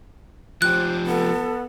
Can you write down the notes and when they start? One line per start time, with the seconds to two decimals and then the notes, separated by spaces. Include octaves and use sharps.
0.62 F3 G4 C5 F#6
1.07 B3 A4